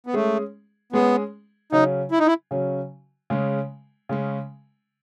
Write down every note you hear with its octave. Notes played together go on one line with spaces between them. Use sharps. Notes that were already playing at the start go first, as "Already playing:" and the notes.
B3
G#3 A3 C#4 G#4
G#3 B3 C#4 G#4
C#3 F#3 C#4 D#4
E4
D#4
E4
C#3 F#3 C#4
C#3 G#3 C#4
C#3 G#3 C#4